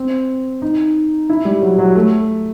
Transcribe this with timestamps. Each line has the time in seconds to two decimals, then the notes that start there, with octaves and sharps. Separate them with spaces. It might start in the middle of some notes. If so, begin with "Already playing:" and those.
Already playing: C4
0.62 D#4
1.29 E4
1.45 G3
1.62 F#3
1.79 F#3
1.95 A3